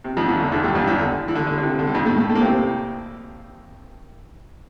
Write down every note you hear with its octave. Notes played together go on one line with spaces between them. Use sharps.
C3
F2 F3
E2 E3
D3
E2 E3
G2 G3
F2 F3
E2 E3
D3
E3
D3
D3
D3
C3
D3
G3
F2 F3
A2 A3
A2 A3
A2 A3
A#3
C3 C4